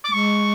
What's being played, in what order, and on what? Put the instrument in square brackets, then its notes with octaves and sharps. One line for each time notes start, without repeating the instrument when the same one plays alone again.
[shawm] D6
[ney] A3
[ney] G#3 [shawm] C#6